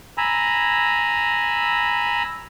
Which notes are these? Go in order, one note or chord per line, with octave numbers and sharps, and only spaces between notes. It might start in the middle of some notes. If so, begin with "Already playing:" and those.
G#5 A#5 B5 E6